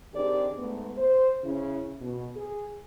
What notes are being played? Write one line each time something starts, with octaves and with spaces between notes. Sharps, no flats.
D#3 C4 D4 G4 G#4 D5
G#2 A3 B3
C5
C#3 C#4 E4
B2
G#4